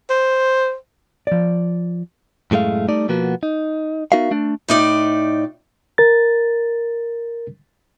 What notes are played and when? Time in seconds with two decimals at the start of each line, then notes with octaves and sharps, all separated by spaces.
0.10 C5
1.27 F3 D5
2.51 F#2 A2 G#3 A3 F5
2.88 G3 A3 D#4 D5
3.08 B2 F3 A#3 B3 F#4
3.43 D#4
4.12 B3 D#4 F#4 A#4 E5 F5
4.31 A3 D4
4.68 A2 D#4 D5
5.98 A#4 A6